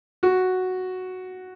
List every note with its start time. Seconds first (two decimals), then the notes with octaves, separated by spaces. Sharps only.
0.23 F#4